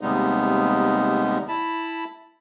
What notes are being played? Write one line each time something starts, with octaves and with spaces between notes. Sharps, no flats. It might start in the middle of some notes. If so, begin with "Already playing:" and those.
D#2 C3 G3 G#3 B3 D#4
E4 A5 B5